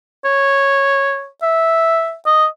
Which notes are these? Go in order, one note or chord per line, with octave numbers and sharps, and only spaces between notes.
C#5
E5
D#5